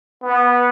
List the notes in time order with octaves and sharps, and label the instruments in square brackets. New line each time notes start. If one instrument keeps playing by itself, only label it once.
[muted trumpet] B3